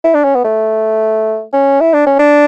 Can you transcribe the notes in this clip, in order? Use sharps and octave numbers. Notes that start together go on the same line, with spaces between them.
E4
D4
C#4
B3
A3
C#4
E4
D4
C#4
D4